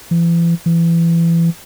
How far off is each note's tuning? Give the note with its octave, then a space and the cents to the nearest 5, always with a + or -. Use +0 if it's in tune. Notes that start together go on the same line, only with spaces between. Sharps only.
E3 +40
E3 +25